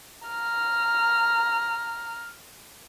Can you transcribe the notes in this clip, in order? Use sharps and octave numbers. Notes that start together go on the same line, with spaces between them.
A#5 F6